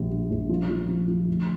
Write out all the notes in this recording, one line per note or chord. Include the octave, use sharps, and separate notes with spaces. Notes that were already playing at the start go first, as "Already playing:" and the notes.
Already playing: A#1 G3
G3
A#1
F3
F3
F3
F3
D2